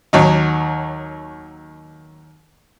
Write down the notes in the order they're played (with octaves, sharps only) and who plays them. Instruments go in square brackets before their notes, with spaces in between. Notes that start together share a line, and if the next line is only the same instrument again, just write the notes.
[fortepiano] D#2 F#3 D#4